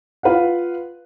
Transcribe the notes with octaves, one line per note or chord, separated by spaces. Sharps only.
F4 B4 F5 F#5